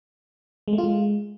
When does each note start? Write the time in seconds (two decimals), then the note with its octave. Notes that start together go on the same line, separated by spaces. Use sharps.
0.68 G#3
0.73 A3
0.78 F4
0.84 G#3